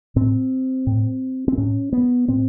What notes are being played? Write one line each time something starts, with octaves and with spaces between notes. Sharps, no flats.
A2 C4
A2
C4
A2 C#4
B3
A2 C4